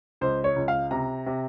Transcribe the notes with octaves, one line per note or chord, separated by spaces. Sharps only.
C#2 C5
C#5
C#2
F5
C3 A#5
C3